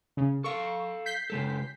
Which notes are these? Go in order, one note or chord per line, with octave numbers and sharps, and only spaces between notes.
C#3
A4 F5 C#6
G6 B6 C7
C#3 G#3 A4